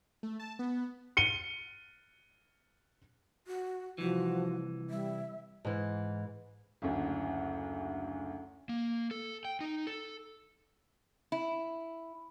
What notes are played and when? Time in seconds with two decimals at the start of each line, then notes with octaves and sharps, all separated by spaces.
0.23 A3
0.39 A5
0.59 B3
1.17 C#7 D#7 G7
3.47 F#4
3.98 C2 E3 F3 F#4
4.90 G3 E5
5.65 G#2 E3
6.82 F#1 D2
8.69 A#3
9.11 A4
9.45 G5
9.61 D#4
9.87 A4
11.32 E4